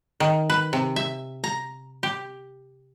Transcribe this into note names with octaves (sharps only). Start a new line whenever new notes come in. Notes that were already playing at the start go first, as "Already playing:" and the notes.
D#3
B4
C3
E5
A#5
G4